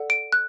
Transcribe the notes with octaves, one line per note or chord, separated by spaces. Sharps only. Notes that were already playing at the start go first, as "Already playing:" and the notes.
Already playing: A4 D5 F#5
D7
F#6